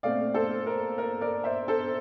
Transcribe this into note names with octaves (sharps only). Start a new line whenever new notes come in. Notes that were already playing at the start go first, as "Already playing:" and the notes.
A#2 A3 C4 D5 F5
A4 C5
A#4
A#4
A#4 D5
C5 E5
A4 C5